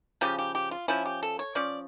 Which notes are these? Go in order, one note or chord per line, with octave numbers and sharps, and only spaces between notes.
C#3 F3 C#4 G4
G4
G4
F4
F3 C#4 E4
G4
A4
C#5
F3 C#4 D5